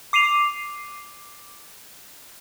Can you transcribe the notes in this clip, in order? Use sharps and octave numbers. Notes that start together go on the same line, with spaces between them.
D6 C7 D#7 F7